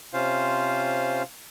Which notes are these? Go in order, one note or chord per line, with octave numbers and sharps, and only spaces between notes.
C3 C#4 F4 C5 F5